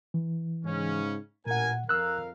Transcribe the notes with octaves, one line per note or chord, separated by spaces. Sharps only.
E3
G#2 C#3 C#4
A1 A#2 A#4 F#5 G#5
F2 A#4 F5 E6 F#6